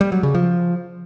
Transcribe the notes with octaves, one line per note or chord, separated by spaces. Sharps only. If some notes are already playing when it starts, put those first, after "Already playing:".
G3
F#3
C#3
F3